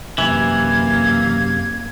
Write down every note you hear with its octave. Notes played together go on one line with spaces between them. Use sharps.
F#2 C3 E3 A#3 G#6